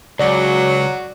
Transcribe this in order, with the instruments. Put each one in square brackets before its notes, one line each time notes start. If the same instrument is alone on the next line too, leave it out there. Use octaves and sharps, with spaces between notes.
[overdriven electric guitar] C#2 [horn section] F#3 [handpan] D5